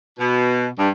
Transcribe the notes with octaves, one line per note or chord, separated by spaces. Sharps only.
B2
G2